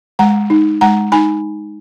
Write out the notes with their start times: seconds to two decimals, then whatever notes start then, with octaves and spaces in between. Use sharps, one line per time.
0.19 G#3 F#5 A#5
0.50 D#4
0.81 G#3 F#5 A#5
1.12 D#4 G#5 B5